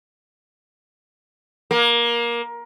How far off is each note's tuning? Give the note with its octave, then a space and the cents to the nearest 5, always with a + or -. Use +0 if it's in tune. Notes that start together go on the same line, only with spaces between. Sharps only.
A#3 +20